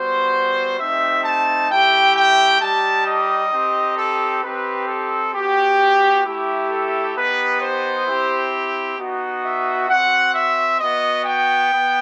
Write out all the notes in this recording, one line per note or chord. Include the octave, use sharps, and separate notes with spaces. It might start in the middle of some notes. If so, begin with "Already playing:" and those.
Already playing: G3 B3 F#4 C5
A3 C4 D#4 G4 E5
A5
A3 E4 G4 G5
G5
G3 D#4 G4 A5
D#5
C4 D#4 G4
A4
C4 D#4 G4 B4
A4
B3 F#4 G4
A3 E4 G4
A4
B3 D#4 G4 B4
C5
C4 E4 G4
B3 D#4 F#4
E5
C4 F#4 F#5
E5
B3 F#4 D#5
G5
B3